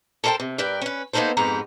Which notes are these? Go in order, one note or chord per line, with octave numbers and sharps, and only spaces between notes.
A4 A#4 C5 D5 G5 A5
C3
G2 A#4 B4 D5 G5
C#4 B4
A#3 B3 D4 D#4 A4 C5
F2 G#2 B3 G4 A#5